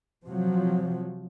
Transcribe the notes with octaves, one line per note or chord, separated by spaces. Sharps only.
C3 F3 F#3